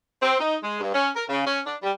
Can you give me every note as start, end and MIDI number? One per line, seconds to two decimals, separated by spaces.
0.22 0.38 60
0.40 0.56 63
0.63 0.78 56
0.80 0.93 43
0.94 1.10 61
1.16 1.24 70
1.29 1.42 49
1.47 1.60 61
1.67 1.76 62
1.83 1.91 55